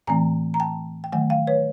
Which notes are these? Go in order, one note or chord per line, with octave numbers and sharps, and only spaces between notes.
A2 E3 A3 C4 G#5 A#5
A#5
G5 A5
G5
D#3 F#3 A3 F#5 G#5
F5 G5
B4 C#5